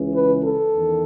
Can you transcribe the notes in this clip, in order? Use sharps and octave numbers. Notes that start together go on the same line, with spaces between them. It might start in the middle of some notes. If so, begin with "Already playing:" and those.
Already playing: C#2 C#3 E3
B4
A4
E2 D#3